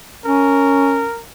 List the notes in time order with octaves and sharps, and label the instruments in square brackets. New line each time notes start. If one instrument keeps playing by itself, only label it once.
[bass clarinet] C#4 [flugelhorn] A#4